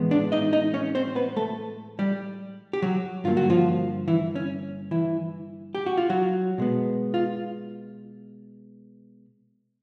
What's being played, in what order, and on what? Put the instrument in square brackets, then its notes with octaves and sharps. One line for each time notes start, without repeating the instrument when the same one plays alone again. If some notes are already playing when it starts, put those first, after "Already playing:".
Already playing: [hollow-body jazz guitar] A2 E3 G#3 B3
D4 D5
D#4 D#5
D#4 D#5
C#4 C#5
C4 C5
B3 B4
A3 A4
G3 G4
G4
F#3 F#4
G2 D3 F#3 A#3 F4
F#4
F3 F4
E3 E4
C#4
E3 E4
G4
F#4
F4
F#3 F#4
B2 G#3 B3
F4